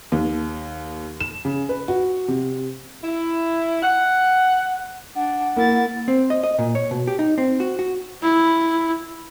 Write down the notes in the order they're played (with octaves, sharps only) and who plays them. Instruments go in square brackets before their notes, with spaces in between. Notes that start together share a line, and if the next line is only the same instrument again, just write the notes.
[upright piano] D#2
E7
C#3
B4
F#4
C3
[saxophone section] E4
F#5
[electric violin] D4 [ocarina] F#5
[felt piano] A#3 [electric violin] E4 A6
[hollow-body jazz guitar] C4
D#5
D#5
A#2
C#5
B2
G4
D#4
C4
F#4
F#4
[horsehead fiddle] E4